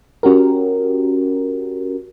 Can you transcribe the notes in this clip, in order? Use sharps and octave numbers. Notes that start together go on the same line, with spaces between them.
C#4 F#4 G4 A#4